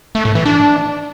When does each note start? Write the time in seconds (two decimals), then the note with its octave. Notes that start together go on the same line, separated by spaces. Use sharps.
0.15 A3
0.25 A2
0.35 E3
0.45 D4